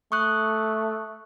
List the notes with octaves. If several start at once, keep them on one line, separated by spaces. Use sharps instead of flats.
A3 C#6 D#6 F#6